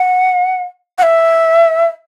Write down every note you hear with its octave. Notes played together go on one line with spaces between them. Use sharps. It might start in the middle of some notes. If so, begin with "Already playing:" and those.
Already playing: F#5
F#5
E5